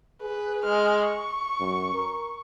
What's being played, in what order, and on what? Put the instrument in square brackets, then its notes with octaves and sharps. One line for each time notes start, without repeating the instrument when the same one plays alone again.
[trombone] G#4 [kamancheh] B4
[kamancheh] G#3 F6
C#6
[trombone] F#2
A#4